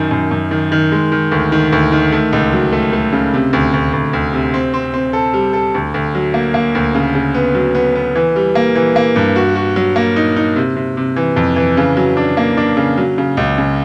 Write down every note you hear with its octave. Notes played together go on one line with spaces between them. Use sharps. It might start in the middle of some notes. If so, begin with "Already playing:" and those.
Already playing: F#2 D#3
F#2
F#2
D#3
D#3
G#3
D#3
D2
D#3
D2
D#3
A3
C#2
F#3
A3
A3
C#3
C3
D2
D2
D2
D2
C3
C4
C4
C4
A4
G3
A4
D2
D2
F#3
A#3
A#3
D2
C#3
C#3
B3
F#3
B3
B3
E3
G3
A#3
E3
A#3
G2
F#4
F#4
F#3
A#3
D#4
D#4
C3
C3
C3
E3
F2
E3
C#3
F#3
D4
A#3
D4
C#3
F#3
C#3
C#2
C#3